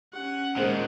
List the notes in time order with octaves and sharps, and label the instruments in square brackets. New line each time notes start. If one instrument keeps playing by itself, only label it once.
[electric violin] C#4 F#5 [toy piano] G4
[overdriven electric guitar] A#2 D#3 [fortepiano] G#3 A#3 [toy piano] C5